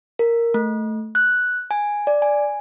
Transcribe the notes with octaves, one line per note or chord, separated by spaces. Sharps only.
A#4
A3
F#6
G#5
D5
G#5